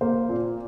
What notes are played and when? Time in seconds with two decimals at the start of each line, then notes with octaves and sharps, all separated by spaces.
0.01 A#3 C5
0.29 A#2